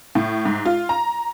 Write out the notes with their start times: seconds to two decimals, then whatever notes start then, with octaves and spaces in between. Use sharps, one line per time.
0.15 A2
0.45 G#2
0.65 F4
0.89 A#5